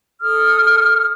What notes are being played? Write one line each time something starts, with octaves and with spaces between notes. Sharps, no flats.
A4 D#6 F6